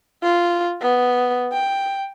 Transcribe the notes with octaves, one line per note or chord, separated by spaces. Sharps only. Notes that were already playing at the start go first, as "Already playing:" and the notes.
F4
B3
G5